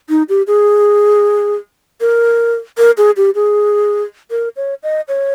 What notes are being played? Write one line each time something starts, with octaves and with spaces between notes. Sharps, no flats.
D#4
G4
G#4
A#4
A#4
G#4
G4
G#4
A#4
C#5
D#5
C#5